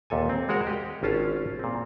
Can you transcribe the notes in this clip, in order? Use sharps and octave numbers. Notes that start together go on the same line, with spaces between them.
D#2 A#2 A4 G#5
C4
G#3 F#4 A#4 F#5
G4 D#5
G#1 C#4 F4 F5 A5
A#2 C4